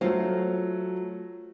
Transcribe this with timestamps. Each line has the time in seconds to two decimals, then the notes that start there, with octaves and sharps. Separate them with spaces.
0.01 F#3 A3 F4 C5